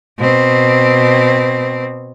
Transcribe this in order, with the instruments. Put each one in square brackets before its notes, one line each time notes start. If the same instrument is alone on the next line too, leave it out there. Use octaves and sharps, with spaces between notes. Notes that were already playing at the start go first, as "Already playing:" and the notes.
[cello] B2 C4